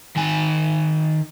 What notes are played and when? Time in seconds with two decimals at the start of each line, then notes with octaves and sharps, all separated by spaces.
0.17 D#3 G#5